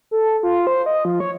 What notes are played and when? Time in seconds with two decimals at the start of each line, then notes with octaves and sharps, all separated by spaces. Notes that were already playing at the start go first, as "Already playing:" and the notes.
0.11 A4
0.43 F4
0.67 C5
0.86 D#5
1.05 F3
1.20 C#5